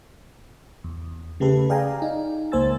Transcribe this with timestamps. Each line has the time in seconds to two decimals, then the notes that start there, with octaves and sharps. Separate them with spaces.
0.84 E2
1.40 C#3 A3 G4 A4 B4
1.69 G#4 D5 F5 G5 G#5 A#5
2.02 D#4
2.52 C#2 A#3 C5 G#5 E6 A6